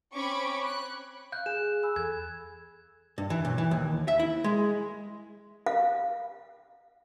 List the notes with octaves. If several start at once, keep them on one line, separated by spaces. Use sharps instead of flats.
C4 C#4 B5 C#6 D6
F#6
F5 F#6 G6
G#4 E7
G#5 B5 E6
E2 A4 G#6
G2
E3
B1
E3
D#2
E5
E4
G#3
F5